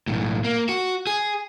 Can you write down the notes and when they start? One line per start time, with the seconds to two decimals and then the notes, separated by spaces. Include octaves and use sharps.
0.08 B1 A2
0.44 A#3
0.69 F#4
1.07 G#4